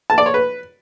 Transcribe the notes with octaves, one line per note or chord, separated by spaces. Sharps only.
A5
D5
C#5
B4